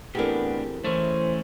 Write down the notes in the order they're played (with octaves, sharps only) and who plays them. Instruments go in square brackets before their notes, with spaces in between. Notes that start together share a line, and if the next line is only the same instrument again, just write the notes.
[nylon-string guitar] E2 A4 A#4 [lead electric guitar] A2 D4 [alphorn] B3 [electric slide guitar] C4 G4
[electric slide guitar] E3 E4 [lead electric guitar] A3 C#4 [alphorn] C5